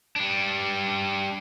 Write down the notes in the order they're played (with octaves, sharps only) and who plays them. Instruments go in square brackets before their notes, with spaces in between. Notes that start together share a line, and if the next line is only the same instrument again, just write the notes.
[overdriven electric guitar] G3 D4